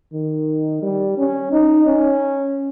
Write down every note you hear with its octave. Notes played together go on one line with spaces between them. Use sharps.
D#3
G3
C#4
D#4
C#4